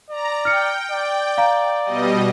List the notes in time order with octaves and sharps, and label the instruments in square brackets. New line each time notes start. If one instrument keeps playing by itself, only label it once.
[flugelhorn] D5 [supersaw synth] A#5
[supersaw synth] G5 [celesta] F6 C#7
[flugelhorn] D5
[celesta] F5 A#5
[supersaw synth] B2 G3 D#5